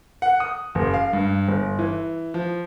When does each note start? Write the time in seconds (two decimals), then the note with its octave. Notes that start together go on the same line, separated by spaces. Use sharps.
0.22 F#5
0.40 D#6
0.75 F#1
0.94 F5
1.13 G2
1.48 G1
1.79 E3
2.34 F3